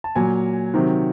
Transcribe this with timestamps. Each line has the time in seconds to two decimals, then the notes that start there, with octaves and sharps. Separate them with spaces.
0.04 A5
0.16 A#2 F#3 G#5
0.74 C3 D#3 F#3